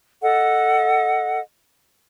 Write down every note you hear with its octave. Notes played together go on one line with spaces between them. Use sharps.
A4 D#5 F#5